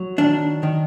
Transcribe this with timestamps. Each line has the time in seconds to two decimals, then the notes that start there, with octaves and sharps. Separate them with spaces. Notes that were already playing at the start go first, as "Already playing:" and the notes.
Already playing: F#3
0.18 D#3 D4
0.63 D#3